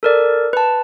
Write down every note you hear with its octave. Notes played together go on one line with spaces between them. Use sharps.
A4 A#4 D5
B4 A5